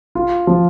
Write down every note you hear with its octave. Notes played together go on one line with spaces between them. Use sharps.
F4
F3